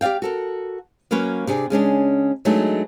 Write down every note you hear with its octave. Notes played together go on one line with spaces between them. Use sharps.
G4 D5 D#5 F5 G5
F#4 A4 A#4
F#3 A#3 C#4 B4 C#5
C3 D4 G#4
C#3 G#3 C#4 D4
F#3 G#3 A3 B3 D4 D#4